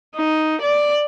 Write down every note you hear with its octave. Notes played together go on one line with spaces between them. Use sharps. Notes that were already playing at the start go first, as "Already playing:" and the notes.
D#4
D5